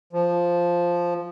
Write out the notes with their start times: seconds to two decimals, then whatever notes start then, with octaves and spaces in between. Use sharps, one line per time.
0.13 F3